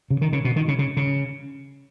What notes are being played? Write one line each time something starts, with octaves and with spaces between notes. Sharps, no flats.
C#3
D#3
C#3
B2
D#3
C#3
C#3
C#3